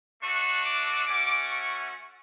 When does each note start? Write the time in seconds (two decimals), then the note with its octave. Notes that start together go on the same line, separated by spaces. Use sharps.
0.21 A3 D4 F#4 C#6
0.64 D6
1.07 A3 C#4 F#4 D6
1.50 C#6